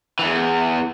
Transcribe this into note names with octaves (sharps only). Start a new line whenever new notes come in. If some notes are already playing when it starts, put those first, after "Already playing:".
E2 E3